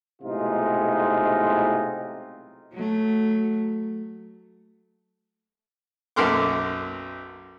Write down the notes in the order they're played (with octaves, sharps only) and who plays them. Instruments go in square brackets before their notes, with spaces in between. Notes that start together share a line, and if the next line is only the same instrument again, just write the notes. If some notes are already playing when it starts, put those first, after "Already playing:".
[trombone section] B1 A2 C3 G#3 D#4 F4
[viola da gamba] F#3 A3
[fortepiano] B1 F#2 A4 A#4 C6 D6